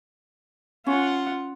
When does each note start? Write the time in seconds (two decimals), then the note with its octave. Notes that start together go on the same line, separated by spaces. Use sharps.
0.87 C#4 F4 F#5